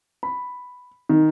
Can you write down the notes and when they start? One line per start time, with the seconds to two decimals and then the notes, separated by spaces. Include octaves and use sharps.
0.23 B5
1.09 D#3